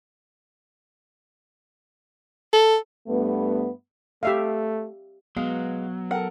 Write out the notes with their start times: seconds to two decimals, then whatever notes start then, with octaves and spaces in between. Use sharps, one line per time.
2.53 A4
3.07 G2 A3 B3
4.23 A3 G4 E5 F5
5.37 F#3 G#3 B3 F5
6.11 A4 A#4 F#5